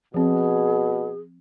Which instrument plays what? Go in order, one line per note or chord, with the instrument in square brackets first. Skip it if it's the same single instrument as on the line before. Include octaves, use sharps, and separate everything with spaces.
[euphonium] B2 [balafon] F3 C4 [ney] G#4